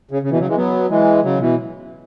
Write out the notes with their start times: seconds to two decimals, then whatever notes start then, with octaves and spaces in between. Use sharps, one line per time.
0.11 C#3
0.22 C#3
0.31 B2 E3
0.39 C#3 F#3
0.47 E3 G#3
0.56 F#3 B3
0.90 E3 G#3
1.23 C#3 F#3
1.40 B2 E3